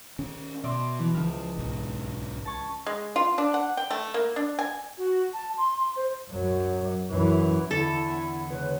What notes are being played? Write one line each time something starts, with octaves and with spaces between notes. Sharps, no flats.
D#3 C#4
B2 D5 E5 C6
E3 E7
C#2 F3 F6
B1 G#2
A5 C#6 G#6
G#3
F4
D4
F#5
G5
A3
A#3
D4
G#5
F#4
A5
C6
C6
C5
F#2 F#3
F#2 E3
E2 D3 E4 A4
B3 G#5
C#3 G#3 B4